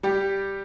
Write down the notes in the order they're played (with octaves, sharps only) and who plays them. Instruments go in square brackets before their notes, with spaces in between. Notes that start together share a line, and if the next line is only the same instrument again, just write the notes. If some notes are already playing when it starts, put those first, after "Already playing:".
[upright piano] G3 G4